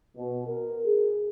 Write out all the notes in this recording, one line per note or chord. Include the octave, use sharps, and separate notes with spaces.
B2
A#4
G#4